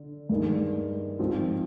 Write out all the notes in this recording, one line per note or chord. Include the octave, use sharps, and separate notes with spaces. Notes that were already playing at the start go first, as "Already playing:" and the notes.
Already playing: D3
G2 D#3 G#3
G#2 F3 C4